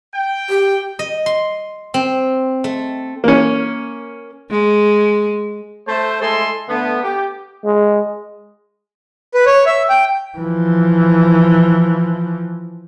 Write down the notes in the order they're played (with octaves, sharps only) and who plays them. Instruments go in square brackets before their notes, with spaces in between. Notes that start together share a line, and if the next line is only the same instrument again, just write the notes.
[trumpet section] G5
[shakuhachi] G4
[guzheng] D#5
C6
C4
A3
[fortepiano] A#3 C#4
[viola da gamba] G#3
[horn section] A3 C5
G#3 A3 E4 A4 C6
D3 A3 B3
G4
[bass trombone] G#3
[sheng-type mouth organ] B4
C#5
E5
G5
[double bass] E3 F3